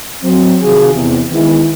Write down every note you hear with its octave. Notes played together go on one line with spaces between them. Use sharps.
F#3 C4
C3 D#3 F3 F#4 G#4
E2 C3
D#3 G#3 B3 E4